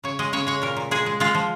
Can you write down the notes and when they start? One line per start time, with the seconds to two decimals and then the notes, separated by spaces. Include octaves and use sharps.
0.04 C#3 C#5
0.19 G#3 D#5
0.33 C#3 C#5
0.47 G#3 C#5
0.62 A#2 A#4
0.76 A#2
0.91 G#3 G#4
1.06 G#3
1.20 G#3 F4
1.35 F3